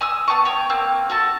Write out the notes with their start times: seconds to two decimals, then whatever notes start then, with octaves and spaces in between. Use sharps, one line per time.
0.01 G#5 D#6 E6
0.28 B3 F#4 A5 C#6
0.45 C#5 G5
0.70 A#3 C4
1.10 F#4 A4 A5